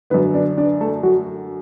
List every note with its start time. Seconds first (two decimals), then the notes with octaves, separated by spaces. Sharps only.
0.10 D3 B3 B4
0.14 F#2
0.34 D4 D5
0.57 D4 D5
0.81 A3 A4
1.03 F#3 F#4